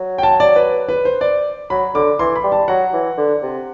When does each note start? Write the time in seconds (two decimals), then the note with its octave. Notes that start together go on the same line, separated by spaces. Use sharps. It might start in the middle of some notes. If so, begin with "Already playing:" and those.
Already playing: F#3
0.18 G5
0.23 A5
0.40 D5
0.56 B4
0.89 B4
1.05 C5
1.21 D5
1.70 F#3 B5
1.95 D3 D6
2.19 E3 C6
2.36 B5
2.43 G3
2.52 A5
2.68 F#3 F#5
2.93 E3
3.17 D3
3.42 C3